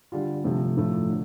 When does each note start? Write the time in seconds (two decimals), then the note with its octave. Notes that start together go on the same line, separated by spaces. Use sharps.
0.12 D3 G3 F4
0.44 C3 F3 A3
0.77 A2 F3 A3
1.09 D3